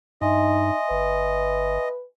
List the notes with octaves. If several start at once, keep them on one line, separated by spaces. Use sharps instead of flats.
G2 D#4 D#5 E5 G#5 C6
G1 B4